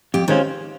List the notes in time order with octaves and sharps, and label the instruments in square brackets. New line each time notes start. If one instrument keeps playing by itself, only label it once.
[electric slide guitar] F2 [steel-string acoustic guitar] G4
[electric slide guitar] D#3 G#3 C#4 F4 [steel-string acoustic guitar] C4